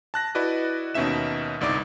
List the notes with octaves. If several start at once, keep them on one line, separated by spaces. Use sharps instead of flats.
A5 F#6 A#6
E4 F#4 B4 D5 D#5
D#2 B2 C#4 D#4 E5 E7
G1 C2 D#4 D5 D6